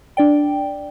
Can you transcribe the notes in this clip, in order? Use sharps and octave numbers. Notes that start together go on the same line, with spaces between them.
D4 D5 G5